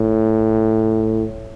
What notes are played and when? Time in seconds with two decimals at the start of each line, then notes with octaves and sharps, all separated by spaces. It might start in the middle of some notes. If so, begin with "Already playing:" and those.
Already playing: A2